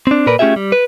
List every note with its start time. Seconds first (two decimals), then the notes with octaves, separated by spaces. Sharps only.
0.07 C4 D4
0.27 A#2 A#4 B4 D5
0.39 A3 C#4 F4 G4 G#4 E5
0.56 G3
0.72 B4